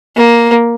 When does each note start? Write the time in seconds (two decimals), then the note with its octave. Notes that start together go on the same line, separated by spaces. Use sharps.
0.17 A#3